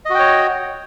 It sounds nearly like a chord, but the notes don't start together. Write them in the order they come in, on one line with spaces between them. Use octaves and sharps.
D#5 F#4 G5 C#5